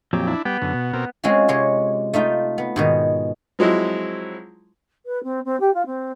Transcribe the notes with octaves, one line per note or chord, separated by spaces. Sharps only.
F2 A#2 F#3 G4
D4 E4
G3 B3 G5
F#2 D3
B2
B2 C4 A#4
G#3 C4 C#4 F4 F#4
C3 G#3 C#5
A3 D#4 F4 G5
B3
G#2 B2 D#3
F3 F#3 G#3 C4 E4
B4
C4
C4
G4
F4
C4